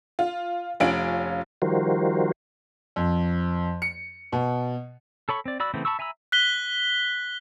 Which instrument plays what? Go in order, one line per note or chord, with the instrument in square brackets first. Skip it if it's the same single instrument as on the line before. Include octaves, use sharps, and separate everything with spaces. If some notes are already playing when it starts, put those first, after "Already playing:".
[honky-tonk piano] F4
F1 C#4 F4 D7 F#7
[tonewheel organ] D#3 F3 G3 F#4 A#4 C5
[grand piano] F2
C#7
B2
[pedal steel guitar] A4 C#5 B5 C#6
C4 D5
F#4 D5 B5 E6
C#3 E3 A3 B3 C4
A5 B5 C#6 E6
E5 G#5 A#5 B5 E6
[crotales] F#6 B6 G7